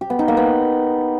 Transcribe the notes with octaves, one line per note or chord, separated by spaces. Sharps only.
G4
B3
D#4
A#3
B3